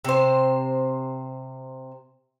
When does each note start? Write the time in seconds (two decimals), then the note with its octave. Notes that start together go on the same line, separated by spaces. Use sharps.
0.05 C3 C5